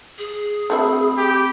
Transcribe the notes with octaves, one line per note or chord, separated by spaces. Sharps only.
G#4
A3 C4 F#4 E5 B5
G4